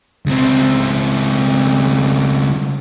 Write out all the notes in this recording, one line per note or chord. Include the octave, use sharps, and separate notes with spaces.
C#2 C4